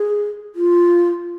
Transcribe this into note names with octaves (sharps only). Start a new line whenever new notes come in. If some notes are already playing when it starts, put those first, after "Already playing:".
Already playing: G#4
F4